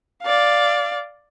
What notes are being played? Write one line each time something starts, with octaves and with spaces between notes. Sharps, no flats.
D5 F5